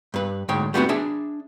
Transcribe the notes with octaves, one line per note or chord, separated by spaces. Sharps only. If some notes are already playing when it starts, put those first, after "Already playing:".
G2 B4
D2 G#2 C#5 G5
G3 A3 B3 C4 D#4 F#4
D4 G#4 E5